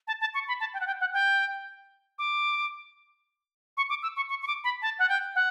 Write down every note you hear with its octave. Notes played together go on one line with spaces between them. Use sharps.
A5
A5
C#6
B5
A5
G5
F#5
G5
F#5
G5
D6
C#6
D6
E6
C#6
C#6
C#6
D6
B5
A5
F#5
G5
F#5